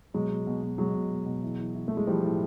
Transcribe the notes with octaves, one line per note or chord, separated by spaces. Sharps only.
B2 F#3 G#3
B2
B2
B2
B2 F#3 G#3
B2
B2
B2
E3
E3
E3
E3 A3
G#3
E3 F3 G3
A2